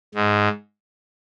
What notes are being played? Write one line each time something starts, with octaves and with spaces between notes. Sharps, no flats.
G#2